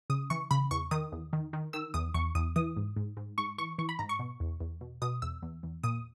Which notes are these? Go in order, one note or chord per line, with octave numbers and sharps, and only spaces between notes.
C#3 D#6
E3 C#6
C#3 B5
E2 C#6
D#3 D#6
E2
D#3
D#3
D#3 E6
E2 D#6
E2 C#6
E2 D#6
E3 D#6
G#2
G#2
G#2
G#2 C#6
E3 C#6
E3 C#6
B5
G#2 A#5
C#6
B2
E2
E2
B2
B2 D#6
E2 E6
E2
E2
A#2 D#6